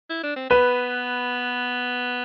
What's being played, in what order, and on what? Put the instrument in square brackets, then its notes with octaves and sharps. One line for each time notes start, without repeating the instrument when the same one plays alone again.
[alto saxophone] E4
D4
C4
[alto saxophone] B3 [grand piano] B4